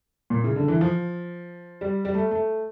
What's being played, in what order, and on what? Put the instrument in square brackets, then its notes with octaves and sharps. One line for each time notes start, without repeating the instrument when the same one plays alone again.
[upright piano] A#2
C#3
D3
E3
F3
G3
G3
A3
A3